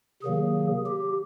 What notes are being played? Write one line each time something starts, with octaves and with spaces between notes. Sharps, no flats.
C3 D#3 F#3 A#3 G#4
G4